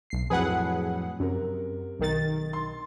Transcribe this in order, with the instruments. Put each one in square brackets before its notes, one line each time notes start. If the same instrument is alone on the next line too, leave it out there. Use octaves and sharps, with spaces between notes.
[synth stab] B1 C7
[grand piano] F2 A2 F#3 [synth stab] G#4 B4 F#5
[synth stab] F#2 [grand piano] C3 A#4
[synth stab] B1 D#3 A6
[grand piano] C6